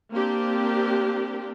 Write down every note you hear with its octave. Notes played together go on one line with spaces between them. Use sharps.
A#3 C4 D4 G4